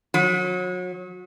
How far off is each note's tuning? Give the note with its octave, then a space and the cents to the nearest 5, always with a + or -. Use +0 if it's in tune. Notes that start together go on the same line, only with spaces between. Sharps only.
F#3 -30